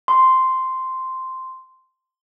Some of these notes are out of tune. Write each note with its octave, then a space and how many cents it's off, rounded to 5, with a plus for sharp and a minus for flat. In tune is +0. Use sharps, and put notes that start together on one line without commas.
C6 -5